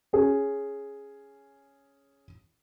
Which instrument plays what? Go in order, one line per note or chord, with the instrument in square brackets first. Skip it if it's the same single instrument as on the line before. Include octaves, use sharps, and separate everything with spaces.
[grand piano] C#4 G#4